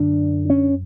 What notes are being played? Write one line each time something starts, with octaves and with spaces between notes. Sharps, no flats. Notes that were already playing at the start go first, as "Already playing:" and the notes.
Already playing: F#2 D3 D4
C#4